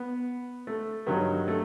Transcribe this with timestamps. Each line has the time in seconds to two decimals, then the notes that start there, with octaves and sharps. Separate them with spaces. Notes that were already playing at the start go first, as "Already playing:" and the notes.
Already playing: B3
0.67 A3
1.07 G2 D#3 F#3
1.48 A3